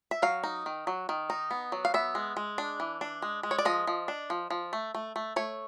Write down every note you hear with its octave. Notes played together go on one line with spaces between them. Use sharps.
E5
F#3 F5
D#4
D#3
F#3
D#3
D#4
B3
F#3
F5
B3 E5
G#3
G#3
D4
E3
D4
G#3
G#3
C#5
D5
F3 D#5
F3
D4
F3
F3
A3
A3
A3
A3 C#5